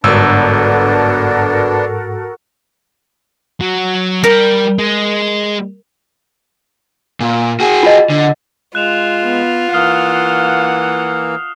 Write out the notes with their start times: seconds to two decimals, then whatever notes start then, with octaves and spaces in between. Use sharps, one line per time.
0.04 G1 G#2 B3 D4 F#4 A4 A#4 E6
3.61 F#3
4.24 G3 A#4
4.79 G#3
7.20 A#2
7.60 F#4 G#4
7.83 F4 D#5
8.10 D3
8.75 G#3 F4 F#6 E7 F7
9.24 B3
9.73 E3 A#3 F#5 D#6 F6 C7